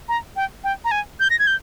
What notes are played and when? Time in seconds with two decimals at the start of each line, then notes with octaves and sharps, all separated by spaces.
0.09 A#5
0.36 G5
0.64 G5
0.85 A#5
0.91 G#5
1.20 G6
1.30 A#6
1.39 G#6
1.47 G6